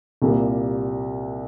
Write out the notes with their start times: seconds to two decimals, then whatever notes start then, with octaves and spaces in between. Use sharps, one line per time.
0.22 C2 A#2 G3 A#3